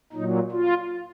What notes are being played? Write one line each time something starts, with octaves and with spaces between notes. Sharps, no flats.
A#2 F#3 D#4
F4